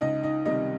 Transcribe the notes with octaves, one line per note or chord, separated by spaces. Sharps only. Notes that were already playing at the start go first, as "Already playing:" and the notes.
C#2 D#4 D#5
D#4 D#5
C3 D#3 G3 D#4 D#5